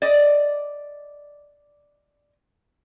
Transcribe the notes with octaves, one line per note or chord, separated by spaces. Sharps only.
D5 D#5